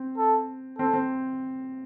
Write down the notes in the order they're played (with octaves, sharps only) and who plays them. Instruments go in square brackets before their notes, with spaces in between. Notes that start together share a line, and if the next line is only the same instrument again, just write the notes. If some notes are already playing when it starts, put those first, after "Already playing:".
Already playing: [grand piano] C4
[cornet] A4
[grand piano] C4 [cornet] A4
[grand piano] C4